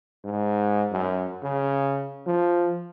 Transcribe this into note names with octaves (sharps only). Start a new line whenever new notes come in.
G#2
F#2
C#3
F3